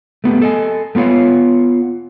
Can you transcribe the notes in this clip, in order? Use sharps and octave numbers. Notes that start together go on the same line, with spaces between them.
A3 B3 F4 G4
A4 D#5 G#5
A3 B3 F4 C#5 F5